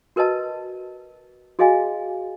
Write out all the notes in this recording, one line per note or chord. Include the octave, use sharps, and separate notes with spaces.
F#4 A#4 B4 D#5 A5
F#4 G#4 D#5 F5 G#5